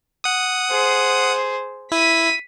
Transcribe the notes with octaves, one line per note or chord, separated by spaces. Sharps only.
F#5 D#6
G#4 C5
E4 B6 D#7